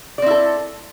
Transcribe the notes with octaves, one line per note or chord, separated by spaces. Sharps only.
C4 E4 A4 D5